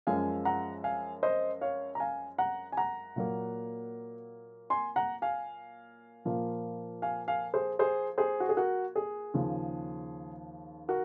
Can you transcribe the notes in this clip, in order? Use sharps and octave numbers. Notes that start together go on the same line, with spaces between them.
F#2 F3 G#3 F5 G#5
F#5 A#5
F5 G#5
C5 D#5
C#5 F5
A#5
F5 G#5
F#5 A#5
G#5
F#5 A#5
A#2 F#3 A#3
G#5 C6
F#5 A#5
F5 G#5
A#2 F3 A#3
F5 G#5
F5 G#5
G#4 C5
G#4 C5
G#4 C5
F#4
G#4
F#4 A#4
G#4
D#2 C#3 F3
F#4 A#4